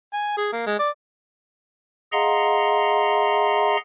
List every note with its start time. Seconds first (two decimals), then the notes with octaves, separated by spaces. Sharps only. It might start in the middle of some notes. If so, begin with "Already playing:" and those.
0.13 G#5
0.37 G#4
0.53 A#3
0.66 G#3
0.79 D5
2.12 G#4 D#5 F5 F#5 A#5 C6